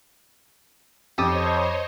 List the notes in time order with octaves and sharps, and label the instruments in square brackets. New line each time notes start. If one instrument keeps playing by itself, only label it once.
[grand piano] F2 [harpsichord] G4 [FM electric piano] A4 A5 D#6 [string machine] C5 C#5 D#5